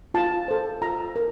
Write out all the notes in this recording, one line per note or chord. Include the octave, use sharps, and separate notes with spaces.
F4 A5
A4 C5
F4 A#5
A#4